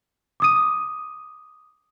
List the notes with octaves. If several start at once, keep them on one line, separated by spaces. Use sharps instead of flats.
D6 D#6 D#7